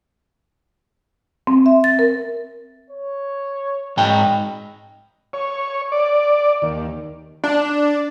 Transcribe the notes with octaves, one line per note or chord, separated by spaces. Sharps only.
C4
E5
A6
A#4
C#5
G#2 D#5 G5
C#5
D5
D#2
D4